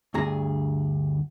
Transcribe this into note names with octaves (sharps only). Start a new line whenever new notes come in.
D2 G2 G#4 A#5